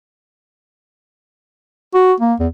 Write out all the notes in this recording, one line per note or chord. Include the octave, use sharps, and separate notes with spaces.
F#4
A#3
E2